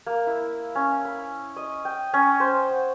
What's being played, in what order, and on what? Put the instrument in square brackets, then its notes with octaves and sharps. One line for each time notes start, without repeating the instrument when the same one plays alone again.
[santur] A#3
E4
C#4
B5
D#5
G5
C#4
C5
F#5